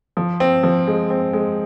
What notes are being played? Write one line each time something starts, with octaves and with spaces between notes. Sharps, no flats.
F3
C4
F3
G#3
C4
G#3